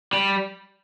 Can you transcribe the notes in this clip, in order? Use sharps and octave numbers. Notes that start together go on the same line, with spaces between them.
G3